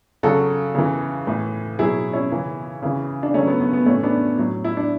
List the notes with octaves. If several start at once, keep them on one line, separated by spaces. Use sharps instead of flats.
C#3 F#3 F#4 A4
C#3 E3
A2 E3
B2 F#3 E4 G#4
C#4 E4
C#3 E3
C#3 E3
D4
C#3 F#3 A3 C#4
B3
B3
B3
A2 E3 A3 C#4
B3 D4
A2 F#3
E4
D4